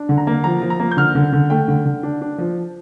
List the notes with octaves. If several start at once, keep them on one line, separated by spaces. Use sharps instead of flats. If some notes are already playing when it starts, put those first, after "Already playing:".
Already playing: D4
D3
A#5
A#3
F3 A#5
F3
A#5
A#3
G6
D3 F6
D3
D3
A3 G5
D3
D3
D4
D4
F3